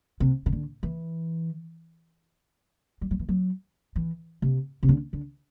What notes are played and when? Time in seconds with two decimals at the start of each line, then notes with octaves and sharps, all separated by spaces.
0.20 C3
0.46 C3
0.52 D3
0.83 E3
3.01 G3
3.11 F#3
3.19 E3
3.29 F#3
3.96 E3
4.42 C3
4.83 C3
4.89 D3
5.13 D3